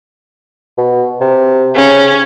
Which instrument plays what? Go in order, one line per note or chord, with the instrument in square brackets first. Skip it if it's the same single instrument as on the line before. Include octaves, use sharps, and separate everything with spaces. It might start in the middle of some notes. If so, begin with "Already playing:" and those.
[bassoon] B2
C3
[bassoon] C#3 [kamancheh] C#4